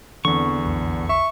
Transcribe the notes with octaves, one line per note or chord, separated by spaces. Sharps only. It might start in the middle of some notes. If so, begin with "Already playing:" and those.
E2 D3 E3 B3 C4 C#6
B1 F2
E5 C#6